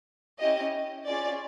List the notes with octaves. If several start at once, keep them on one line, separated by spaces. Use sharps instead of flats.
C#4 E4 G4 D#5
C#4 F4 G#4 D5